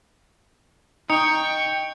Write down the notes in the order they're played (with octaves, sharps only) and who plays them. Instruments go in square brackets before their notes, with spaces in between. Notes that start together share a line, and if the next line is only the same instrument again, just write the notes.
[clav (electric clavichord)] D#4 [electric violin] G5 C#6 [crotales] C#7 F7